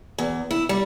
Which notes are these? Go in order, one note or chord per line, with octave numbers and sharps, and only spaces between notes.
E2
E4
G3